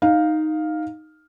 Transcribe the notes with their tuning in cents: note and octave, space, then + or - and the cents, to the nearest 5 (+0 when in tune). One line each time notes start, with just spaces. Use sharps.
D#4 +0 F5 +5